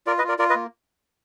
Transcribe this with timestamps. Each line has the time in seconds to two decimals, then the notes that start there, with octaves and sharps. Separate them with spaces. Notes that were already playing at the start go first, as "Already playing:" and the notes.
0.07 F4 A#4 D5
0.18 B4 D#5
0.24 F4 A#4 D5
0.39 F4 A#4 D5
0.50 B4 D#5
0.55 A#3